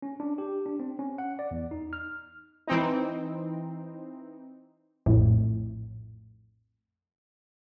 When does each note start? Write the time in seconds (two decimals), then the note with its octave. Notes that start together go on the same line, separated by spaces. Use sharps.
0.02 C#4
0.20 D4
0.38 G4
0.66 D4
0.80 C4
0.99 C#4
1.18 F#5
1.39 D5
1.51 E2
1.71 D#4
1.93 F6
2.67 E3 C4 D#4
5.06 A#1 F2 A2